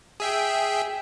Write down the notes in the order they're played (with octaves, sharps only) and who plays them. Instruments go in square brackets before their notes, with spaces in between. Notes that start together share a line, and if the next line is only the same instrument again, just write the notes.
[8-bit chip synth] G#4 E5 G5